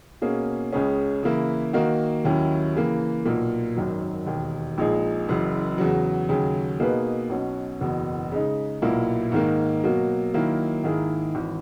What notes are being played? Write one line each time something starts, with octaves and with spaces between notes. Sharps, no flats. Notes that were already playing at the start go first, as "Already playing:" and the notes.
B2 A#3 C#4 G#4
C#2 C#3 G#3 C#4 G#4
C#3 E3 A#3 E4
D#3 A#3 D#4 F#4
D#2 D#3 F#3 C#4 E4
C#3 E3 A#3
B1 A#2 A#3
G#1 F#2 D#3 F#3
E1 D#2 D#3
A#1 A#2 G#3 D#4 G#4
F#1 F#2 C#3 E3
E2 C#3 F#3
D#2 C#3 F#3
B2 A#3 D#4 G#4 B4
B1 B2 F#3 C#4
F#1 E2 B2
C#3 G#3 D#4
B1 A#2 A#3 E4
G#2 D#3 A#3
B2 F#3 A#3
D#3 F#3 A#3 E4
G#2 D#3 A#3 E4 G#4
G#1 E3